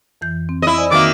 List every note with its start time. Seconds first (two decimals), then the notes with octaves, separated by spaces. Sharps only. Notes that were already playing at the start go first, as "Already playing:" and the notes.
0.21 F2 E3 G6
0.49 C4
0.62 E4 D#5
0.78 C5 D5 G#5
0.91 D#3 A#3 C4 F#4 E5 D6